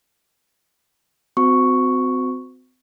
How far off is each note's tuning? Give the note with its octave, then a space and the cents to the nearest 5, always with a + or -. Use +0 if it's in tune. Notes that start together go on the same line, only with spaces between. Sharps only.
C4 -35 F#4 -15 C#6 +0